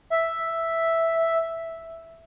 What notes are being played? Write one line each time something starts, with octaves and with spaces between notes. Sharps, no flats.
E5